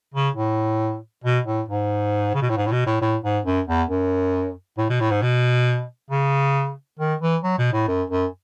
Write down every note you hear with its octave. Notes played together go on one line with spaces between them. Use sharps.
C#3
A2
B2
A2
G#2
C#3
B2
A2
G#2
A2
B2
A2
A2
G#2
F#2
E2
F#2
A2
B2
A2
G#2
B2
C#3
D#3
E3
F#3
B2
A2
F#2
F#2